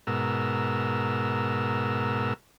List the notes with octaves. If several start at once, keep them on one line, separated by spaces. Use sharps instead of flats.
G#2 B2 A#4 E6